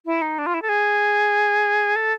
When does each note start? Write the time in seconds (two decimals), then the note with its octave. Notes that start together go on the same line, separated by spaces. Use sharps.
0.06 E4
0.22 D#4
0.38 D4
0.46 F4
0.54 E4
0.62 A4
0.69 G#4
1.96 A4